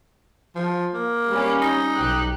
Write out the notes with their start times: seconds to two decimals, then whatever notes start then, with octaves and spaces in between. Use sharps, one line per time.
0.55 F3
0.94 A#3
1.28 G3 C#4
1.61 D#4
1.95 B1 G4 F#6